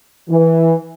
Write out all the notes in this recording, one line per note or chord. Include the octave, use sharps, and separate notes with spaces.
E3